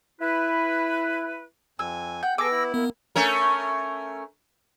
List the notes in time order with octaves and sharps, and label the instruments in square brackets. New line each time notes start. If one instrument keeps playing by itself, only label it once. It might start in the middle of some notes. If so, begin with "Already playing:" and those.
[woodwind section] E4 B4
[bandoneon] F2 G#5 [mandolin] E6
[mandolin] F#5 G5 [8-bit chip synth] G6
[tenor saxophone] B3 [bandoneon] G#4 A4 [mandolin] D6 [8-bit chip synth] E6 A#6
[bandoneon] E4
[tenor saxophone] A#3 [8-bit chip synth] B3
[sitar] A3 C#4 A#4